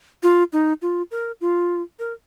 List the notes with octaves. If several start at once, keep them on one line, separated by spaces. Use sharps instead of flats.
F4
D#4
F4
A#4
F4
A#4